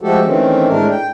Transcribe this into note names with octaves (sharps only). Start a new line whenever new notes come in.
F3 G#3 A3 F#4 G4 A4
D#3 E3 A3 C4 C#4
A2 G#3 A3 D4 A#4
G5